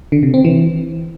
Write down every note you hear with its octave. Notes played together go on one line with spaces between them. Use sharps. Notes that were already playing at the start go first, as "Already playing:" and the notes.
D3
C3
C4
E3